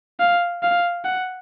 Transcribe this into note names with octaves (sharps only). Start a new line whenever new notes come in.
F5
F5
F#5